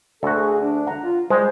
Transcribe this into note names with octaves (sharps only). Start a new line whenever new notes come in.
D2 F#4 A4
G#4
D4
F#5 A#5
F4
G3 G#3 C5 G5